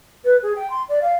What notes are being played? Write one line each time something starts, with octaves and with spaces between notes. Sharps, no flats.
B4
G#4
G5
C6
D5
F5